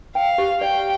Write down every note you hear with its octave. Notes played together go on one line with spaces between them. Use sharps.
F5 G5
G4
D5 G5